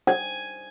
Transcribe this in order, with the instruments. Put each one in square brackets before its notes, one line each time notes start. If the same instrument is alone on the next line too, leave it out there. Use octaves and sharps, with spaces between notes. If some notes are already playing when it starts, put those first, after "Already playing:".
[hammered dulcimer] G#5